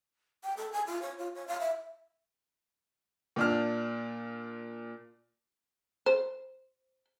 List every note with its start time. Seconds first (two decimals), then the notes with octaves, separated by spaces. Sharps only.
0.44 G5
0.57 A4
0.72 G#5
0.87 F4
1.02 C#5
1.19 F4
1.35 C#5
1.48 F5
1.60 E5
3.36 A#2 D4 F6
6.06 C5